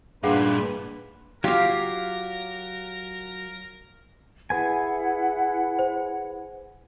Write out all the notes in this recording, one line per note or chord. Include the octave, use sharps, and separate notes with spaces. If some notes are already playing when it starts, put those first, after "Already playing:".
G2 A#2 D4 G#4 B4 F5 F#5
F#3 F4 G4 A#4 F5
E4 G#4 B4 F#5 G#5
C5